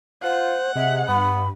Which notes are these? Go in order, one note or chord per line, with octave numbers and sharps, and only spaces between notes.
F4 C5 F#5
C3 G#3 E5
G2 B3 B5